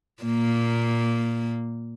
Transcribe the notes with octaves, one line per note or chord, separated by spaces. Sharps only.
A#2 A#3